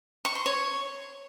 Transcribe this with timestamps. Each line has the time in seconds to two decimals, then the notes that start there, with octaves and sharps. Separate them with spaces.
0.25 C#6
0.35 C6
0.46 C#5